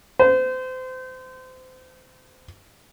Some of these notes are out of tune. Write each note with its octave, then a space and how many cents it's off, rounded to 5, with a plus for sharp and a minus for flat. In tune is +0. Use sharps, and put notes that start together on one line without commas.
C5 -30